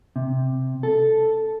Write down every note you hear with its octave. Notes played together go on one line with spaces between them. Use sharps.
C3
A4